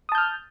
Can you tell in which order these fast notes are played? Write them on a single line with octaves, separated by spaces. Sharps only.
D#6 A5 G6 F6